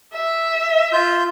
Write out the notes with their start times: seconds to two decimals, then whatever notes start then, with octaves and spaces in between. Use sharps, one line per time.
0.14 E5
0.92 F4 G6